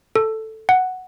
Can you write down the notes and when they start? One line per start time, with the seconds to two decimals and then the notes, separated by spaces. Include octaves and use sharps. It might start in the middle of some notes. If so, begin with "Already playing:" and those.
0.16 A4
0.69 F#5